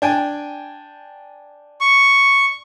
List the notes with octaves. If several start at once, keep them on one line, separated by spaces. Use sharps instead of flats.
D4 G5 G#5
C#6